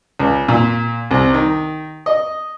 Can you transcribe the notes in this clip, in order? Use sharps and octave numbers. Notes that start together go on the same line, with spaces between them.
C#2
A#2
C2
D#3
D#5